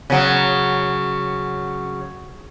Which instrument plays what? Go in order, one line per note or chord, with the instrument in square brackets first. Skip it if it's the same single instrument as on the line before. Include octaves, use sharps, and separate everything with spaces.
[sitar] C#3 F#3